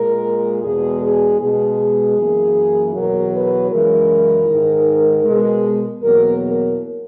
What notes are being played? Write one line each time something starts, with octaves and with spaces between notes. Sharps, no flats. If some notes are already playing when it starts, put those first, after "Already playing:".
Already playing: A#2 G#3 A#4
E2 B2 G#3 G#4
G#4
B2 G#3 G#4
F#2 E3 A#3
E2 B2 F#3 A#4
B4
F#2 C#3 E3 G#3 A#4
G#2 D#3 G#3
B2 G#3
E2 B2 F#3 A#3 A#4
A#4